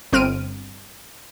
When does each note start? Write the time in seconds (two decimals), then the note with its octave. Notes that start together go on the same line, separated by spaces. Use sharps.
0.13 G1 C4 F6 D7 D#7